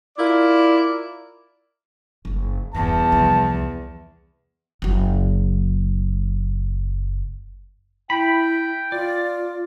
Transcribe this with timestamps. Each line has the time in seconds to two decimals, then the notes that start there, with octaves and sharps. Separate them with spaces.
0.17 E4 F4 A#4 D5
2.25 F#1 D3
2.74 E1 E2 G2 A5
3.12 C2 F3
4.82 F#1 F#3
8.10 E4 G5 B5
8.92 F4 D5